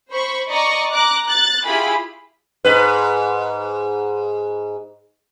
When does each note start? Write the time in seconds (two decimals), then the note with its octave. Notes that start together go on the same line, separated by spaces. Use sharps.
0.10 C5 B5 C#6
0.50 D5 D#5 A#5 C#6
0.93 A#5 D6 F#6
1.28 F#6 A6
1.65 E4 F4 G4 G#4 B5
2.65 G#2 B4